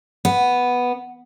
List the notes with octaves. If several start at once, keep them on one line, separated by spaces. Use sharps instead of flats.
B3